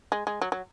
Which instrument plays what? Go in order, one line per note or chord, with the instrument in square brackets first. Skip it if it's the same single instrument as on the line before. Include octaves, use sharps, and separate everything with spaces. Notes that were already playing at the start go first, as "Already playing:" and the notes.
[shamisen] G#3
G#3
F#3
F#3